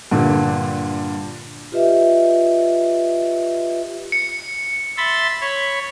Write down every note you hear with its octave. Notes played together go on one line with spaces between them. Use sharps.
G2 A#2 D3
F4 G4 B4 D#5 E5
C#7
E5 B5 C6 A6
C#5 B5